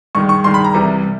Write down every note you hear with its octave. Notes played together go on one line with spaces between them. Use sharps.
G2 D#3 G#3 C#6
C#6
G2 D#3 G#3 C6
B5
A#5
C2 C3 E3 G3
C3